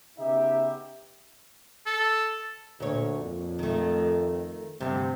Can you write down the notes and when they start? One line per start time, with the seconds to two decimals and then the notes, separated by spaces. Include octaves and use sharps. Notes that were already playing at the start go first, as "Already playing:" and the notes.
0.18 C#3 B3 D#4 G4 E5
1.86 A4
2.80 D2 A#2 C#5
3.19 F2
3.59 D#3 A3
4.81 D2 G2 C3